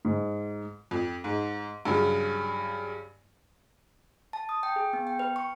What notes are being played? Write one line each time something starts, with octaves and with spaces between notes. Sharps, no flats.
G#2
F2
G#2
G2 C#3 F#3
A5
D#6
G5
G#4
B3
G5
B4
C#6